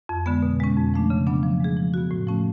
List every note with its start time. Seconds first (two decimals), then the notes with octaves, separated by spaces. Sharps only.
0.09 F2
0.26 D3 G#3 B3
0.43 B2
0.60 G#3 C#4
0.77 F2
0.94 F3 A3 D4
1.10 C#3
1.27 F#3 B3 D4
1.43 F3
1.60 G#3 D4 G#4
1.77 F3
1.94 B3 F#4
2.11 A2
2.27 F3 A3 C#4